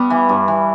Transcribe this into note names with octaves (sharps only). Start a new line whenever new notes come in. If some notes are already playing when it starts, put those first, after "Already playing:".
Already playing: G2 G3 B3
E3
G2
E3